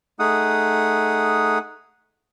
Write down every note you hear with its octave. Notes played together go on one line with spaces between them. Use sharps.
A3 D#4 G#4 F#5 D#6